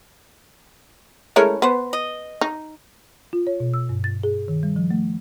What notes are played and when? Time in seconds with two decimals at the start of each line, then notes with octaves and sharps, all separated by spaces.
1.36 G#3 A3 C#4 E4 A#4 C#5
1.62 B3 B4 C5
1.93 D#5
2.41 D#4
3.33 F4
3.47 C#5
3.60 B2
3.74 E6
3.89 G2
4.04 A6
4.23 G#4
4.48 D#3
4.63 G3
4.76 F3
4.91 A3